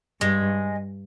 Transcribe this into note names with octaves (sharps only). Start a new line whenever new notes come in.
G2 G#3